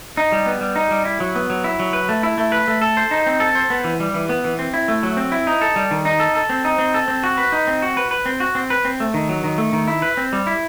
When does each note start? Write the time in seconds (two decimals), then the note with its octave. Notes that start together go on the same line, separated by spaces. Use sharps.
0.17 D#4
0.32 G3
0.46 B3
0.61 G3
0.76 D#4
0.91 G3
1.05 E4
1.20 F#3
1.35 B3
1.50 F#3
1.64 E4
1.79 F#3
1.93 B4
2.09 A3
2.23 E4
2.38 A3
2.52 B4
2.68 A3
2.81 A4
2.97 C5
3.11 D#4
3.26 C4
3.40 A4
3.55 C5
3.70 B3
3.84 E3
4.00 G3
4.14 E3
4.29 B3
4.44 E3
4.59 C4
4.74 E4
4.88 A3
5.03 F#3
5.17 C4
5.32 E4
5.47 D#4
5.61 A4
5.76 G3
5.91 D#3
6.05 D#4
6.20 A4
6.35 A4
6.50 C4
6.65 D#4
6.78 C4
6.94 A4
7.08 C4
7.23 F#4
7.38 B4
7.52 D#4
7.67 C4
7.82 F#4
7.97 B4
8.11 B4
8.26 C4
8.40 F#4
8.55 C4
8.70 B4
8.85 C4
9.00 A3
9.14 D#3
9.29 F#3
9.44 D#3
9.58 A3
9.73 D#3
9.88 E4
10.02 B4
10.17 C4
10.33 G3
10.47 E4